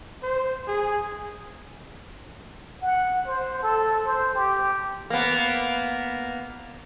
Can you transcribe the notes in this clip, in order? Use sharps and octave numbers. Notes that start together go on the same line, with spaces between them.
C5
G#4
F#5
C5
A4
C5
G4
A#3 B3